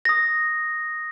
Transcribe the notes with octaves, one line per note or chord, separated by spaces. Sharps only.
D#6 A#6